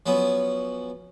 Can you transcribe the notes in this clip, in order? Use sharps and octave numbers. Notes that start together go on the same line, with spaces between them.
F3 F#3 B3 C#4